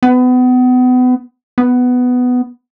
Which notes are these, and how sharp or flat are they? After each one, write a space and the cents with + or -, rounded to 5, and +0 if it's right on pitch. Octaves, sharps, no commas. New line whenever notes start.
B3 +30
B3 +10